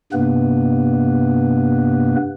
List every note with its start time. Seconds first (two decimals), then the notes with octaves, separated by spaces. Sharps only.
0.13 G2 C3 A#3 B3 B4